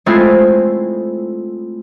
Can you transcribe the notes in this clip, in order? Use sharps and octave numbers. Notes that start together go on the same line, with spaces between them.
G#3 A3 C4 E4 F4